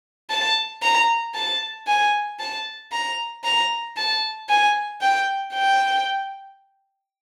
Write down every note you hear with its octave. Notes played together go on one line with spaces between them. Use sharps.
A5
A#5
A5
G#5
A5
A#5
A#5
A5
G#5
G5
G5